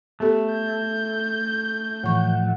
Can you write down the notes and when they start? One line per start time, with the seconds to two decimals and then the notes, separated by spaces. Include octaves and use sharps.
0.20 A3 B3 G4 A4
0.52 G6
2.03 A2 E3 F3 F#5 C#6